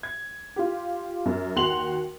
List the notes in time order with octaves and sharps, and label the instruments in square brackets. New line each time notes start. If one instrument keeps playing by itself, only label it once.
[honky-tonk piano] G#6
F4 G4
F#2
D#2 F#4 C6 F7 F#7